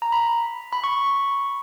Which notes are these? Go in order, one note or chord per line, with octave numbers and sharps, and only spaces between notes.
A#5
B5
B5
C#6